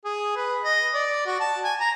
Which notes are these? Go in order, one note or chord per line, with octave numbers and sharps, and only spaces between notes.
G#4
B4
D#5
D5
F#4
A5
G#5
A#5